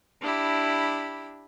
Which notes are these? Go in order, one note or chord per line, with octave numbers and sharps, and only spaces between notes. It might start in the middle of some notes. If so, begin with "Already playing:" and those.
D4 E4 G4 B5